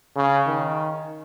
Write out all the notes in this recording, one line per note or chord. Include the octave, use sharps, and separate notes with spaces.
C#3
D#3